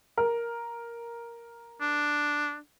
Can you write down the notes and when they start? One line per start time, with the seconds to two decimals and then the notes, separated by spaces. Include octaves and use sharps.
0.18 A#4
1.81 D4